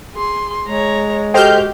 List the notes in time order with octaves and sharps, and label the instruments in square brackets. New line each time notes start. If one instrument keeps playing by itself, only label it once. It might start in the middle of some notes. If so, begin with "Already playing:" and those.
[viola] G#4 C6
[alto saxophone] G#3 [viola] C#5 A#5
[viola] F#4 G4 [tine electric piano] A4 D#5 G5 [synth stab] C5 F6 G6